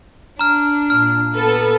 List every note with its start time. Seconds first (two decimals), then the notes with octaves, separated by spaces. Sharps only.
0.39 D4 A#5 F6
0.90 A#2 F6
1.34 B3 A4 B4